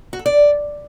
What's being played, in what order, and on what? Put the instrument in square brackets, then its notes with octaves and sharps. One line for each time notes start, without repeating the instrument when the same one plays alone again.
[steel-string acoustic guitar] F#4
A4
D5